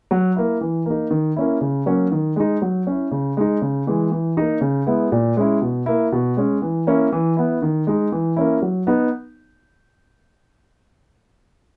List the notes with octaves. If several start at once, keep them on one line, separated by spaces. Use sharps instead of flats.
F#3
A#3 E4
E3
A#3 D#4
D#3
A#3 C#4 E4
C#3
F#3 A#3 C#4
D#3
G#3 D#4
F#3
C#4 E4
C#3
G#3 D#4
C#3
E3 G#3
E3
A#3 D#4
C#3
G#3 B3 E4
A#2
G#3 C#4 E4
B2
A#3 E4
B2
G#3 C#4
E3
A#3 C#4 E4
E3
B3 E4
D#3
G#3 D#4
E3
A#3 C#4 E4
F#3
B3 D#4